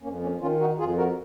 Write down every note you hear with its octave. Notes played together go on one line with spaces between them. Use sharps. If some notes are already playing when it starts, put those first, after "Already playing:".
F2 A#3 C#4
A#3 C#4
D#3 C#4 F4
D#4 F#4
F2 F4 G#4
F#4 A#4